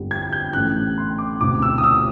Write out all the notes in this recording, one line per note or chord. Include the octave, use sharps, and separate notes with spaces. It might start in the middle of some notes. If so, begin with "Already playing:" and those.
Already playing: G1 F2 D3 G3
G#6
G6
A1 A2 E3 A3 F#6
C6
D6
E1 D2 C3 D6
E6
D#6
E6